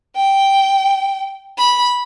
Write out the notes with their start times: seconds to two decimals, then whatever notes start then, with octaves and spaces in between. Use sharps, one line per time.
0.16 G5
1.58 B5